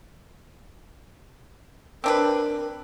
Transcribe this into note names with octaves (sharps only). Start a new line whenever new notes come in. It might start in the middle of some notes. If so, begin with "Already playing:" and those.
C4 D4 A#4 B4